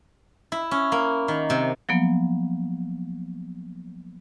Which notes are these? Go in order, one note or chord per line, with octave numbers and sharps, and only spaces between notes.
E4
C#4
A#3
D#3
C3
F3 F#3 A#3 B3